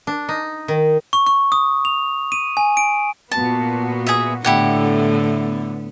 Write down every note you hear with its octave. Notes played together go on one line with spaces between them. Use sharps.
D4
D#4
D#3
C#6
C#6
D#6
F7
D#7
G#5
D7
A#2 B3 F#4 A5
G#4 E5
A2 D3 B3 E4 G4 F#5